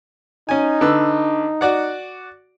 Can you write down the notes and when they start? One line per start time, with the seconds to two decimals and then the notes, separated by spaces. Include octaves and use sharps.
0.49 C#4 D#4 G#5
0.81 D3 B4 E6
1.61 F#4 D5 F#5